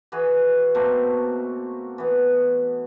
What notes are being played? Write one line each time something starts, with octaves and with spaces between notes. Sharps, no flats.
E3 F#4 G#4 B4
B2 A3 A#3 C4
E3 B3